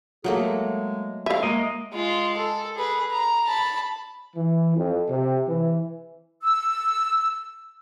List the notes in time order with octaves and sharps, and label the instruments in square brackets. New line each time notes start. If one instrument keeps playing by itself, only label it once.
[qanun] F#3 A3 A#3 [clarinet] G#4
[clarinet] G#3
[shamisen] E5 F5 [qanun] G#5
[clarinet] G#3 [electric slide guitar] A#3 D#5
[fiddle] G#3 F4
A4
G#4 B4
A#5
A5 B5
[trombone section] E3
F2
C3
E3
[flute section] E6